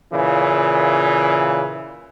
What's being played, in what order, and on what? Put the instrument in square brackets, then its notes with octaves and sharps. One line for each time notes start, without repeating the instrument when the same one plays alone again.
[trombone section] A#2 C#3 E3